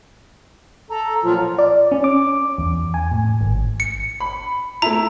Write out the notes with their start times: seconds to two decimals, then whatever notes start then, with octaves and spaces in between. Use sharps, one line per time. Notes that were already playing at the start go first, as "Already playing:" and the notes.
0.90 A4 A#5
1.23 A#2 F3 F#3 F4
1.58 D5
1.92 C#4
2.04 D6
2.58 E2
2.94 G#5
3.11 A2
3.41 G#1
3.80 C#7
4.20 B5
4.82 A3 E4 A#5